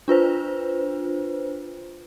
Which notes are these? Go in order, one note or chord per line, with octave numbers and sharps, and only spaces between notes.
D4 F4 B4 C5